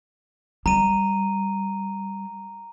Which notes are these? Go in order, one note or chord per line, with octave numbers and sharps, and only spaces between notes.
G3 A#5 D#7